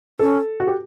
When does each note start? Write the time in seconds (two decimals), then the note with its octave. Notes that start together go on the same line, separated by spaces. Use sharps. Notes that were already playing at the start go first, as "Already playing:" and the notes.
0.19 C#4 A4
0.60 F#4
0.67 G4